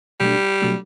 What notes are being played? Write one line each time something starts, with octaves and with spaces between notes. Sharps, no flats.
B2 F#3 G3 A3 D4
B2 F#3 A3 D4